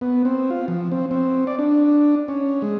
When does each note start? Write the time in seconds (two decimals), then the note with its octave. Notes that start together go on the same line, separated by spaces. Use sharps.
0.01 B3
0.25 C4
0.50 F4
0.68 F3
0.92 C4
1.11 C4
1.47 D5
1.59 D4
2.28 C#4
2.62 G#3